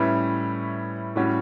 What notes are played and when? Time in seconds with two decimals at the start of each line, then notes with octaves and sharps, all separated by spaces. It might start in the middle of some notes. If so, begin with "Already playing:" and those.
Already playing: A2 G3 C#4 E4 B4
1.16 A2 G3 C#4 F#4